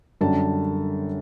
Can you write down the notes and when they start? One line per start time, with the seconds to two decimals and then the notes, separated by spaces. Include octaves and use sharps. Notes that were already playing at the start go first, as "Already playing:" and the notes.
0.21 F#2 D3 G3 A5